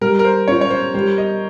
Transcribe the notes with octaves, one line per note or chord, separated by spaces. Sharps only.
G3 A#4
A#4
C5
C#4 F4 C#5
C#5
C5
G3 C5
D#5